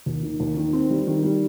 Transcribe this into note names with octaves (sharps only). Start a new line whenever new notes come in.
D#2
D#3
D#2
D#3
C4
G3
D#3
G3